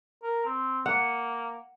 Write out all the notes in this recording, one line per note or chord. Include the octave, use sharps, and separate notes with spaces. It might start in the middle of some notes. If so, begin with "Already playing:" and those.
A#4
C4
A#3 F#5